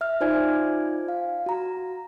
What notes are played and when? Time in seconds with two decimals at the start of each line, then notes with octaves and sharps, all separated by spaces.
0.01 E5 F6
0.21 D#4 F4 C5 D5 G#5 G#6
1.08 F5
1.46 F#4 A#5